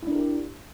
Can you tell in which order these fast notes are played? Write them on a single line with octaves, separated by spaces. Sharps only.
E4 D4 A#4 G4